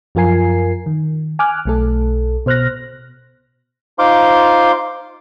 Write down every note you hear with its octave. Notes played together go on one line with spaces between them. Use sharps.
F#2 F3 F4 A#4 G#5 C7
D#3
G#5 D6 F6 F#6
B1 A3 A4
B2 C5 F6 F#6 A#6
D#4 F4 C5 F5 C6 D6